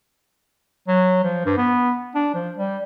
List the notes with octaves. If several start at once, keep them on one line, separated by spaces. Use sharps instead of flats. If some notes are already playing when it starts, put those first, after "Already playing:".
F#3
F3
G2
B3
D4
F3
G3